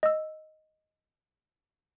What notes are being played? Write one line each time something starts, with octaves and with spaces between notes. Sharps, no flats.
D#5 E6